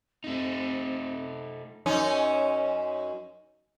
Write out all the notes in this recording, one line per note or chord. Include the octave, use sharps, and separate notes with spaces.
A3 C4 D#4
F#2 C#4 D#4